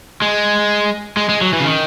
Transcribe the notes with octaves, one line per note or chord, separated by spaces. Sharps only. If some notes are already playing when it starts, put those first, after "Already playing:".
G#3
G#3
G#3
F#3
E3
C#3
D#3